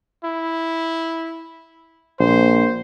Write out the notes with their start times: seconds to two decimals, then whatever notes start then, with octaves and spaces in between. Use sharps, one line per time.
0.24 E4
2.20 A#1 C5